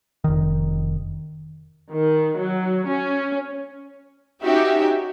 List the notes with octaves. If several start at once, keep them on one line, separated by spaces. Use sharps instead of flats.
F1 D#3
D#3
F#3
C#4
C#4 D#4 F#4 G4 E5